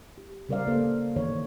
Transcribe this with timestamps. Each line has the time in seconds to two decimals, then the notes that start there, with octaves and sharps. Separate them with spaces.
0.18 G4
0.49 C#3 G3 A#4 C5 D5 F5
0.67 A#3 A4 C5
1.16 D#3 E3 B3 C#5